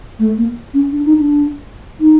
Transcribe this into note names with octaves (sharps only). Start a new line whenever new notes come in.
A3
A#3
C#4
D4
D#4
D4
D#4